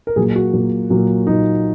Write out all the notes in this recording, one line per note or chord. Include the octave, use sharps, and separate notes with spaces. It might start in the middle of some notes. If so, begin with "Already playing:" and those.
A#4
A#2 F#3 A#3 G#4
F#4
A#2 F#3 A#3
A#2 F#3 A#3
A#2 F#3 A#3 D#4